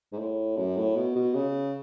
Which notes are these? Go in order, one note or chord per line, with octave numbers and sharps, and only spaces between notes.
G#2
A2
F#2
A2
B2
B2
C#3